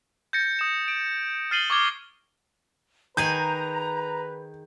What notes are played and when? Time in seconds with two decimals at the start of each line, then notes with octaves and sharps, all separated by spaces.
0.33 G6 A6 A#6 C#7
0.59 D#6 E7
0.88 D7
1.51 F6 A6 C7 D#7 F#7 G7
1.70 C#6 D6 G#6 G7
3.17 D#3 G#4 B4 G#5 A#5 G6